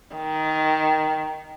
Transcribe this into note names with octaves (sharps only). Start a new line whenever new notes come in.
D#3